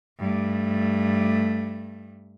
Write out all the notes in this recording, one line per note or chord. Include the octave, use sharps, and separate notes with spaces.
G2 A3